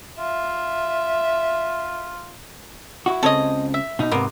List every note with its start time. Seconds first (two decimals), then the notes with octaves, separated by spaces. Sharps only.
0.19 F4 E5
3.06 E4 F#4
3.23 C#2 C#3 C4 A4 C#5 D#5
3.74 E5
3.99 B2 D#4
4.11 G#2 C3 A#3 B3